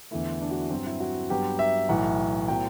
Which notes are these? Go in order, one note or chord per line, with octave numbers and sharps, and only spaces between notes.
E2 D3 A3 E4
D4
F#4
E4
G2 F#3 C4
E4
F#4
G2 F#3 B3 G4
E5
B1 A2 E3 F#5
A2 F#3 B3 G5